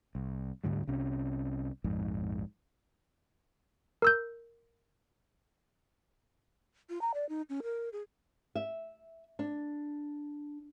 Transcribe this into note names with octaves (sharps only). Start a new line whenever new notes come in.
C2
D2 G#2 D3 G3
C2 C3 C#4
A#1 F2 G#2
A#4 E6 G6
F4
A#5
D5
D#4
C#4
A#4
G#4
E5
D4